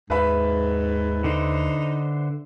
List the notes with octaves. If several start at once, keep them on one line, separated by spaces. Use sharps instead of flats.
D#2 G#2 B4 E5 B5
D3 D#4 C5